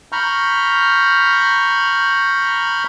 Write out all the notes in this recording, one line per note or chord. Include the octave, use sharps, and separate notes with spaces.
A#5 B5 C#6 F6 G6